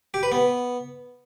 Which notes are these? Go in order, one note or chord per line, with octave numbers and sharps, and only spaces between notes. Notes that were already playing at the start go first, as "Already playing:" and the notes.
G4
B4
B3